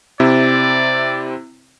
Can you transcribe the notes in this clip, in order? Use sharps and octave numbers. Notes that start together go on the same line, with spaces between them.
C3 C4 E4 D5